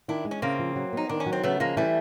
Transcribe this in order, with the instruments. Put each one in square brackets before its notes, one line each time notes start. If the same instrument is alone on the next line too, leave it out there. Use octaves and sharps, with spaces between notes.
[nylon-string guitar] D#3 [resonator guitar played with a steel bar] D4 E4
[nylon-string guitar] G#3
[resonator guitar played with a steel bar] C#4
[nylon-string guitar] C#3 [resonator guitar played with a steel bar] A#3 C4
[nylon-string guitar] F3
F#3
[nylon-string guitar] B3 [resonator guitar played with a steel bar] D#4
[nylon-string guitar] D#3 [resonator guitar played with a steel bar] D4
[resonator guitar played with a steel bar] C#4
[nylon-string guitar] F#3
[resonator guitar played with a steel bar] C4
[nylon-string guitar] C#3 [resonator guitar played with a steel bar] A3 B3
[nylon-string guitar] F3 [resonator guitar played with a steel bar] G#3 A#3
[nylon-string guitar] E3 [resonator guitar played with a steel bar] G3 A3